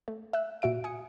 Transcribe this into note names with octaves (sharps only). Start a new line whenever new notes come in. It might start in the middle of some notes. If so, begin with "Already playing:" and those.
A3
E5 E6 F#6
A#2 F#4 E5 D7
G#5 D#6 C#7